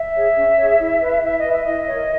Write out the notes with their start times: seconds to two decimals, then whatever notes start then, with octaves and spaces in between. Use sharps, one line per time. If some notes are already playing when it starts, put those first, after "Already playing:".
Already playing: E5
0.15 G#4 C#5
0.36 C#4
0.57 G#4 C#5
0.79 E4
1.02 B4
1.22 E4 E5
1.37 D#5
1.44 B4
1.50 E5
1.65 E4 D#5
1.87 A#4 C#5